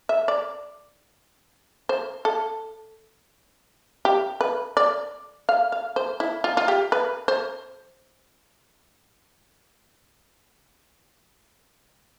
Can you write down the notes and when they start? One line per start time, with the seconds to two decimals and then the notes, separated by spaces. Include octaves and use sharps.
0.09 E5
0.28 D5
1.89 C5
2.25 A4
4.05 G4
4.41 B4
4.77 D5
5.49 F5
5.72 F5
5.96 C5
6.20 E4
6.44 F4
6.57 F4
6.68 G4
6.92 B4
7.28 C5